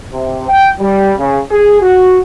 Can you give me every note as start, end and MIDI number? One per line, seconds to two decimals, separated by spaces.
0.12 0.47 48
0.49 0.72 79
0.79 1.12 55
1.18 1.40 49
1.51 1.81 68
1.81 2.19 66